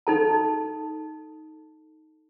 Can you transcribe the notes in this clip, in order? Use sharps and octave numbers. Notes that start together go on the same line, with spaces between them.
D#4 A4 A5